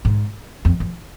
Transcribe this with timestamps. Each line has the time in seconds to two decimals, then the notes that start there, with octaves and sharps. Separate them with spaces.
0.05 G#2
0.65 F2
0.80 F2